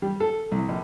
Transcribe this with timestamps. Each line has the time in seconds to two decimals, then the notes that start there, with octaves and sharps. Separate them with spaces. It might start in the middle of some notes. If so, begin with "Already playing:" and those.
0.02 G3
0.20 A4
0.51 C2
0.69 A#1